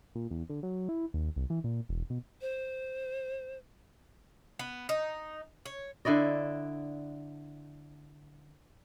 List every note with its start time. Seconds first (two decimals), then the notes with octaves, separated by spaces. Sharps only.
0.15 A#2
0.31 E2
0.50 D3
0.63 F#3
0.89 E4
1.14 D#2
1.36 C2
1.50 E3
1.64 A#2
1.89 E1
2.10 B2
2.41 C5
4.59 B3
4.89 D#4
5.66 C#5
6.05 D3 E4 D5 D#5